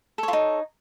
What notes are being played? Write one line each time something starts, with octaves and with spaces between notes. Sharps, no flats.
D#4 F4 A4 C#5